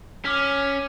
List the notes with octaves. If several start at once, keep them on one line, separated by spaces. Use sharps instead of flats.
C#4 D6 F6 B6